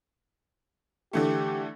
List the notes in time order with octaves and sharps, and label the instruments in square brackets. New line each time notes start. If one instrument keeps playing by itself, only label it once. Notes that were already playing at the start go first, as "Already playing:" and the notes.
[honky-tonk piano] D3 E3 A3 [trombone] G4